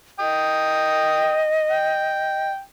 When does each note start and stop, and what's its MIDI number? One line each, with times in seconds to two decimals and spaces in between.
0.20 2.50 75
0.20 1.44 79
0.20 1.44 87
1.71 2.60 79